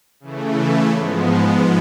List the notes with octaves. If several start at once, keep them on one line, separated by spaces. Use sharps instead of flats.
C#3 E3 A3
G#2 F3 G#3 B3